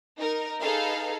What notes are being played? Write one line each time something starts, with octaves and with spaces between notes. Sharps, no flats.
D#4 A#4
D#4 G#4 A4 B4 F5